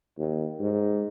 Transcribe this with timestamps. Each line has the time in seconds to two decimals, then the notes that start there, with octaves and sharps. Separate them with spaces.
0.18 D#2
0.60 G#2